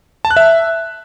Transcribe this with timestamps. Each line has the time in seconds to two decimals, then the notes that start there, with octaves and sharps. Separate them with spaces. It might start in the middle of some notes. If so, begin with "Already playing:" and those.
0.25 A5
0.31 F#6
0.37 E5